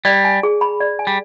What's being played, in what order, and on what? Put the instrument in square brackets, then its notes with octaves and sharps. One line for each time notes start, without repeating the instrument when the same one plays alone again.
[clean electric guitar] G3 [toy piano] D5
[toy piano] G#5
G#4
B5
D5
G#5
[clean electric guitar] G3